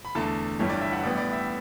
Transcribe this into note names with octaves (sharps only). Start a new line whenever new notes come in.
B5
E2 D3 A3 A5
G1 G2 E3 G3 C#5
D5
E5
F#5
A1 A2 G3 B3 D5
D5
E5